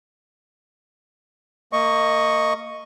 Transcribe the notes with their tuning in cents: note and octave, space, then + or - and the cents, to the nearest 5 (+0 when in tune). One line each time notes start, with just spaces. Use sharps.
A#3 -25 D#5 +0 C#6 +0